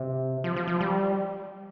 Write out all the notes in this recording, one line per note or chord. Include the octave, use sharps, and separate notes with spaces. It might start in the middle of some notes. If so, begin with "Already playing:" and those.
Already playing: C3
F3
F3
F3
G3